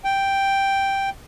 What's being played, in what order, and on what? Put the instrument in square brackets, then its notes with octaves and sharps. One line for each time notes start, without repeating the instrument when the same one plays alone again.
[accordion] G5